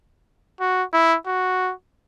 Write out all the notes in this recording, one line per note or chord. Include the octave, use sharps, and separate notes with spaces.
F#4
E4
F#4